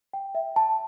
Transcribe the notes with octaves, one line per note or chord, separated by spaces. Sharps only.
G5
E5
A5